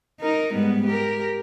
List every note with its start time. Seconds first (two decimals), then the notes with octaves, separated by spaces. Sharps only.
0.20 D#4 A#4
0.53 G#2 G3 B3
0.86 G4 A#4